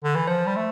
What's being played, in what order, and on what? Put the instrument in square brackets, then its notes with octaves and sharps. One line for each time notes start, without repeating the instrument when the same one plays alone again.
[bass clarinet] D3
E3
[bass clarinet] F3 [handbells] C5
[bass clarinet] G3
A3